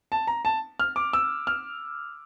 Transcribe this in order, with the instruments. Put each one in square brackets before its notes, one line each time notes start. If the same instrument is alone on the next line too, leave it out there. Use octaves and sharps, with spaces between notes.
[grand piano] A5
A#5
A5
F6
D6
E6
F6